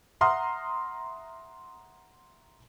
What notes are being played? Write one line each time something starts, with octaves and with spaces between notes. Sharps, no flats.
E5 F#5 A#5 C6 D#6 F6